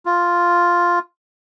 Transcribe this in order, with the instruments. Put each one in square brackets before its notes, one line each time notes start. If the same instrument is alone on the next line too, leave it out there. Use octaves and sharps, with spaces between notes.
[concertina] F4